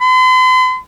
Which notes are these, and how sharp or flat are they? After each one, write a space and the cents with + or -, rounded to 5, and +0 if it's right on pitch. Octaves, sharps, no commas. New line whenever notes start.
C6 -45